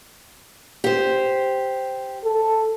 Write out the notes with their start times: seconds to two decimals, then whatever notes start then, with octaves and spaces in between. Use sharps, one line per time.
0.84 G4 C5
2.24 A4